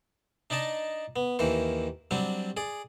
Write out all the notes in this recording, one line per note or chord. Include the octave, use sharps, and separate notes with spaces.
D4 D#4 D5 D#5 A5
B3
D#2 D#3 E3 C5
F#3 G3 C4 D4
G#4 D5